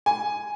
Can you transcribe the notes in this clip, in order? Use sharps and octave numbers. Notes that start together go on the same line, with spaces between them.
G#5